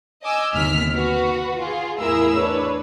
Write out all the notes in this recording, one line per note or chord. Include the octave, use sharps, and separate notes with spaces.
D#5 G#5 D6 E6
G1 D#2 C3 D#3 F6 B6
F#4 B4
F4 G#4
E2 A2 E4 G#4 A#4 E6
D4 B4 C#5